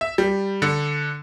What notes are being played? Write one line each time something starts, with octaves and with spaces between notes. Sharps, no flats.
E5
G3
D3